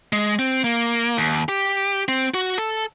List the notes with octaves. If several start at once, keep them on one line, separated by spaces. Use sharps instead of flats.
G#3
C4
A#3
D#2
G4
C4
F#4
A4